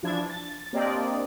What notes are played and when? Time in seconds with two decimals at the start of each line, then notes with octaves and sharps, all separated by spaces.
0.03 E3 F3 D4 A5 G#6
0.30 A6
0.73 A#3 C4 D4 G4 D5 D#5